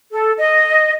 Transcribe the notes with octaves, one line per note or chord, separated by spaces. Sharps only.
A4
D#5